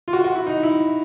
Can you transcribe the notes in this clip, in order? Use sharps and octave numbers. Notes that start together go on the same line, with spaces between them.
F4
F#4
F#4
E4
D#4
E4